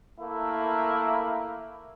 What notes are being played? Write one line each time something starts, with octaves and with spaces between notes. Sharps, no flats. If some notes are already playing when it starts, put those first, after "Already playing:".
A3 A#3 E4 A#4